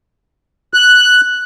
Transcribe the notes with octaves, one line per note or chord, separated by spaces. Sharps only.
F#6